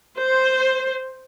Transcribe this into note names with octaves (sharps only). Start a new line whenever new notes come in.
C5